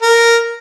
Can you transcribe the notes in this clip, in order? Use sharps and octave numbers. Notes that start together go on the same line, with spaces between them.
A#4